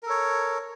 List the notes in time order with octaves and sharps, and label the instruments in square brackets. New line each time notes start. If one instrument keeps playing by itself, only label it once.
[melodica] A#4
A4
C#5